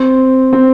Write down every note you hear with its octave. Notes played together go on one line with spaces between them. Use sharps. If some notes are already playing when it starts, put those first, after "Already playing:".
Already playing: C4
C4